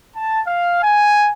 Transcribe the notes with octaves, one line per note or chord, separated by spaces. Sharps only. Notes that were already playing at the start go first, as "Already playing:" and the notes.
A5
F5
G#5